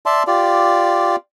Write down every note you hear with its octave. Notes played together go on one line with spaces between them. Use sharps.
D5 E5 A5 C6
F4 G4 D5